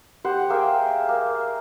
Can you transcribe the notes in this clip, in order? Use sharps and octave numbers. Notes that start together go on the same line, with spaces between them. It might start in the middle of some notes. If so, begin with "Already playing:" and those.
G4 C5 F#5
A#3 G#4 E5 G5
A#3